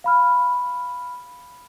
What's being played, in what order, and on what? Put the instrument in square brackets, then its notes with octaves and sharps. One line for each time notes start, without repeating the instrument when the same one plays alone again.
[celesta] F5 B5 F6